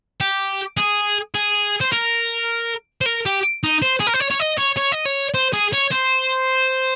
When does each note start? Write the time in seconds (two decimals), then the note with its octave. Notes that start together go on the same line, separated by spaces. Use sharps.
0.21 G4
0.77 G#4
1.35 G#4
1.81 C5
1.92 A#4
3.01 C5
3.06 A#4
3.26 G4
3.64 D#4
3.82 C5
4.00 G#4
4.07 A#4
4.14 C5
4.20 C#5
4.30 C#5
4.40 D#5
4.58 C#5
4.77 C#5
4.92 D#5
5.06 C#5
5.34 C5
5.53 G#4
5.73 C#5
5.92 C5